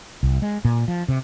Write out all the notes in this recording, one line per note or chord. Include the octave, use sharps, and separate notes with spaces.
C2
G#3
A#2
F3
C3